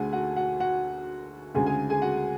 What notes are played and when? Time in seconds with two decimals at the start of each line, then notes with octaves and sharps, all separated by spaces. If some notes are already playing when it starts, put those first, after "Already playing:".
Already playing: D2 D3 A3 G#4 F#5 G#5
0.13 F#4 F#5
0.36 F#4 F#5
0.60 F#4 F#5
1.55 D2 C#3 G#3 G#4 G#5
1.66 G#4 G#5
1.90 G#4 G#5
2.02 F#4 F#5